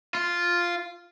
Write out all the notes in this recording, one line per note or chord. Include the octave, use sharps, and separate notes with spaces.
F4